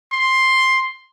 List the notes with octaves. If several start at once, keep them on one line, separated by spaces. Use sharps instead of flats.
C6